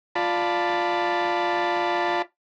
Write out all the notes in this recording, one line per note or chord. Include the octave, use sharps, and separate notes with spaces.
F4 D5 A5 B5